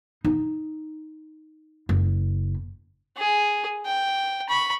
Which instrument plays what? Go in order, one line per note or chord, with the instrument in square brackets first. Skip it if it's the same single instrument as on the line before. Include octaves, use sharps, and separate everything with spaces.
[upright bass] D#4
F#1
[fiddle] G#4
G5
B5 C#6